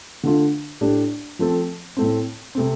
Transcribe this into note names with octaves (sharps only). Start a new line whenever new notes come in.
D3 A3 F4
A2 A3 D4 G4
F3 A3 C4 A4
A2 A3 C4
C3 A3 C4